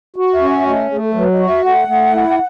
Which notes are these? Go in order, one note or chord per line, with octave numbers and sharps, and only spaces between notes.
F#4
E5
C#4
E5
A3 D#5
A3 G#4
A4
F#3 B4
D#5
F#4
E5
A3 F#5
A3
E4